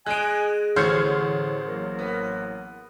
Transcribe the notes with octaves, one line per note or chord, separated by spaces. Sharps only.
G#3 D#5 G#5 F#6 D7
A1 D3 C5 C#5 F6 G#6
F#3 A#3 A#4
B3